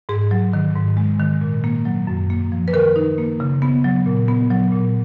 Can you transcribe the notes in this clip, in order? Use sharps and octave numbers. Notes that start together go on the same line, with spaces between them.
G#2 G#4
F#3
D#3
G#2
G#3
D#3
A#2
A#3
F#3
F#2
A#3
F3
B4
D#3 A#4
D#4
A#3
C#3
B3
F#3
A#2
B3
F#3
A#2